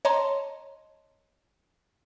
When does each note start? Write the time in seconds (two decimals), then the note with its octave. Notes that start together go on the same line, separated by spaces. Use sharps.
0.05 C#5 D#5 A5 A#5 C6